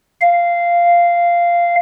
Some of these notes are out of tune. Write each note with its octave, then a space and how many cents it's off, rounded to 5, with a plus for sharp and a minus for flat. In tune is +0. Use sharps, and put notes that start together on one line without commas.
F5 -10